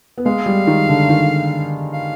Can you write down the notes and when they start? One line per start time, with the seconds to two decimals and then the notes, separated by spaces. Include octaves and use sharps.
0.18 B3
0.26 G#3 F5
0.46 G3
0.67 D#3
0.89 D3
1.09 D#3
1.93 F5